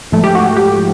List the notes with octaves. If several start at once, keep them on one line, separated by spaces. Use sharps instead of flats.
G#2 F3 A3
G4
F#4
G4